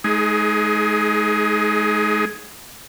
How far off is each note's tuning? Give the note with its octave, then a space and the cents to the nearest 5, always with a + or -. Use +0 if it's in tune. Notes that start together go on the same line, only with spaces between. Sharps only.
G#3 +40 D#4 +25 G#4 +5